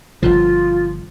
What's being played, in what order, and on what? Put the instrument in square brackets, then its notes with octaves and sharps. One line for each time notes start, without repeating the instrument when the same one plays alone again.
[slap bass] G1 D3 F3 [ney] F4